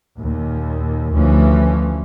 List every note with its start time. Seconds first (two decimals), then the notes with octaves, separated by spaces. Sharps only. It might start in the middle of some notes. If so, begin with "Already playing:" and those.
0.18 D#2 A#2
1.12 D2 E3 F3 C#4